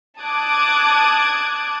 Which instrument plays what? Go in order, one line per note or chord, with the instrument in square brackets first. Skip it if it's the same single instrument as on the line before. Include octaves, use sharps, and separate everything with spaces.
[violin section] A5 D6 D#6 F#6 G#6